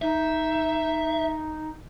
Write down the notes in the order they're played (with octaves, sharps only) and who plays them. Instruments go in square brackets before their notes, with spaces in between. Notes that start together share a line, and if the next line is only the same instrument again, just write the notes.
[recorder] D#4 [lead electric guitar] E5